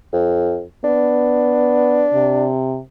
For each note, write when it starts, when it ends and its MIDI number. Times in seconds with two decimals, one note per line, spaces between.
0.13 0.64 41
0.84 2.07 59
0.84 2.48 62
2.13 2.79 48